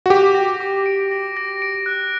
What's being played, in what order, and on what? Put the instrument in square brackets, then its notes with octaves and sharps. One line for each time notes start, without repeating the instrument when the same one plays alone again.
[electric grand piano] F#4
[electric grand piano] G4 [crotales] D6
[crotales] A#6
D6
D7
A#6
A#6
D7
F#6